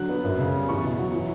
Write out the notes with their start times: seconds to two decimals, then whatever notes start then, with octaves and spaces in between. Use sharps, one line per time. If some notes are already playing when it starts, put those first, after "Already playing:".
Already playing: D3 F#3 F#6
0.09 B3
0.24 F#2
0.39 C#3
0.54 G3
0.69 E2 C#6
0.83 B2
0.98 F#3
1.13 E3